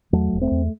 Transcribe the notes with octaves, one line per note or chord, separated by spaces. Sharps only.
E2 F#3 A3
E1
A3 C4
E2